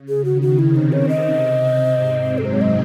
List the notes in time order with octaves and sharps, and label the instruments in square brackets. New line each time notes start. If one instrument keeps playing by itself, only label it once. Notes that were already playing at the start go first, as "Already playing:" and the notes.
Already playing: [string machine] C#3
[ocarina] G#4
[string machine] D#3 [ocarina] F#4
[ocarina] F#4
[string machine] C3 C4 [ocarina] E4
[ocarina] D#4
C#5
D#5
[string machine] G#2 G#3
F#2 F#3
[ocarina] A4
C5
C#5
D#5